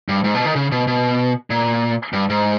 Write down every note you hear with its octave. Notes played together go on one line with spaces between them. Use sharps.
G2
G#2
B2
D#3
C#3
B2
B2
A#2
G2
G#2